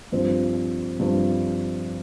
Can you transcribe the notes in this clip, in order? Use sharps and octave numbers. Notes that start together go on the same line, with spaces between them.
G2 F3 C4
G2 F3 C4